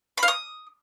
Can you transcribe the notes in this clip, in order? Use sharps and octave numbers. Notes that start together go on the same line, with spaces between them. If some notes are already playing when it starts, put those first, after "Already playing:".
B5
F5
D#6